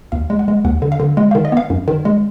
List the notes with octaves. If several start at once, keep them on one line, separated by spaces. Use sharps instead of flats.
D#2 F5
G#3
F#5
G#3
D#2 F#5
D3
F5
D3
G#3 F#5
D#3 F5
D#5
B3 F5
F#2
D#3
G#3